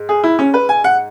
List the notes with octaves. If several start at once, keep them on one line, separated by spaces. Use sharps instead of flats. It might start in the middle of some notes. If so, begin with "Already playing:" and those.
Already playing: G#2
G#4
E4
C#4
B4
G#5
F#5